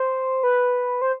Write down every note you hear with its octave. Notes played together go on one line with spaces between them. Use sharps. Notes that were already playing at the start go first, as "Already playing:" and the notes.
Already playing: C5
B4
C5